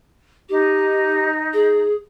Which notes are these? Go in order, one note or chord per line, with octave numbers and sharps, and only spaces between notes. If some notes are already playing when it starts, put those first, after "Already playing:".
D#4 G4
G#4